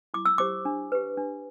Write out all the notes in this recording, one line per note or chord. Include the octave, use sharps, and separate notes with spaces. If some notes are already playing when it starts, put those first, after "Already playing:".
E4 D6
E6
G4 C5 D6
D4
G4 B4
D4